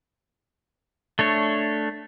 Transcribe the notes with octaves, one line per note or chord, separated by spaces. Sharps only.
A3 D4 C#5